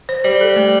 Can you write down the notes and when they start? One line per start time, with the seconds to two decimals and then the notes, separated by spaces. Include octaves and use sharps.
0.09 C5
0.24 G3 C5
0.41 A4
0.56 A3